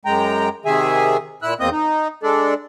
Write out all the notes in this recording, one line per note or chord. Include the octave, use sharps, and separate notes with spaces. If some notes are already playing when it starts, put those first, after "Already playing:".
F#2 G#3 G5 A#5
C3 D#3 G#4 E5 G#5
A#2 E4 E6 F#6
E2 A#3 C4 D#5 D#6 G6
D#4
G#3 D4 A4 D5